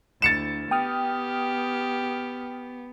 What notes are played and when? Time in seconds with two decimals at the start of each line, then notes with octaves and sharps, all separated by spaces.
0.22 D2 E4 A6 C#7 E7
0.71 B3 G4 G5 D#6 F6